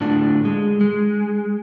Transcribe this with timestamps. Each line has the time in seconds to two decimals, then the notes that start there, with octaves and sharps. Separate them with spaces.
0.01 A2 D3 D4 F4
0.45 G#3
0.81 G#3